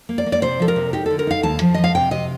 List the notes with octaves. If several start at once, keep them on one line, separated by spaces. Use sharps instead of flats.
A#3
D5
A#3
D5
C3 C5
F3 A4
A#4
C3
D#4 G4
D3 A4
A#4
D#4 F5
D#2 A5
F3
F3 D#5
F5
C3 G5
C3 D#5